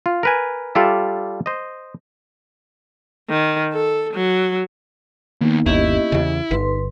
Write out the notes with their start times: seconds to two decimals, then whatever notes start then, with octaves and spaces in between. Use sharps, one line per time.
0.06 F4
0.23 A#4 B4 G#5
0.75 G3 F4 A4 D5 E5
1.46 C5 D#5
3.30 D#3
3.73 A4
4.13 F#3
5.41 D#2 A#3 B3 D#4
5.66 G1 D#2 C#4 E4 G4 D#5
6.12 E2 C#3
6.51 G1 D#4 B4 C6